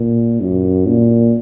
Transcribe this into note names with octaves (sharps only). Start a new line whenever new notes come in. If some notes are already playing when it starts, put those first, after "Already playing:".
Already playing: A#2
F#2
A#2